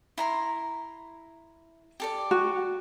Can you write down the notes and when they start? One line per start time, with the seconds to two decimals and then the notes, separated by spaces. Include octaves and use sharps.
0.18 E4 A#5 C6
2.00 G4 A4 D5
2.31 F#4